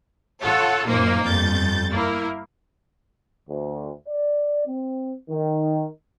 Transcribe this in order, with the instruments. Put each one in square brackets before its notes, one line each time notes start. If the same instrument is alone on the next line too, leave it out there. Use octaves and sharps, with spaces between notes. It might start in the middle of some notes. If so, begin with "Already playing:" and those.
[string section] F4 A4 C#5 F#5
F#2 A#2 A#3 D#4 C5
G1 F2 G6 A6
A#3 E4 A#4
[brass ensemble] D2
D5
C4
D#3